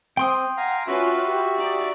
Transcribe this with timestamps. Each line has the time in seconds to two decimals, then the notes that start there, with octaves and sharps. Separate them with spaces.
0.17 C4 G5 C6 D#6
0.57 F5 F#5 G#5 A#5
0.87 C#4 F4 F#4 B4 E5
1.26 G4
1.57 D#4 D5